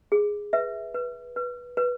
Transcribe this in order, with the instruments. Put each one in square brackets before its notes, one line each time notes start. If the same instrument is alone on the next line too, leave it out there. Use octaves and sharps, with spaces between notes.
[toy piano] G#4
B4 E5
B4
B4
B4